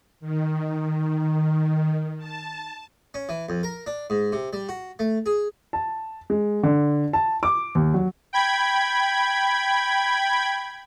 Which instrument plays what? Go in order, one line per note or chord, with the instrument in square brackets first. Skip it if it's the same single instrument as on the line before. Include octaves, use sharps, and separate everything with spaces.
[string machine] D#3
A5
[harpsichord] C#4
E3
F2
A#4
D4
G#2
C3
G3
F#4
A3
G#4
[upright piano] A5
G#3
D3
A5
D6
D#2
F#3
[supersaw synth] G5 B5 G#6